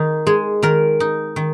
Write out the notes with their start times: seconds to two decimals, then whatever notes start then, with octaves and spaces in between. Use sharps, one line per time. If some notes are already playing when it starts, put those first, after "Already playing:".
Already playing: D#3 D#4
0.27 G#3 G#4
0.62 D#3 A#4
1.00 D#4
1.36 D#3